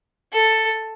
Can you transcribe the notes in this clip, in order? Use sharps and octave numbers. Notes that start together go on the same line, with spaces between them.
A4